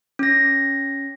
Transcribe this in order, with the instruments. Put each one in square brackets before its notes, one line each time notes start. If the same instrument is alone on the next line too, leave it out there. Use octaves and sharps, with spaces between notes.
[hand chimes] C#4 A#6